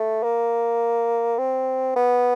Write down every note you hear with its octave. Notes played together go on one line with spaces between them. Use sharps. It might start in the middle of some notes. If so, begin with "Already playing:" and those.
Already playing: A3
A#3
C4
B3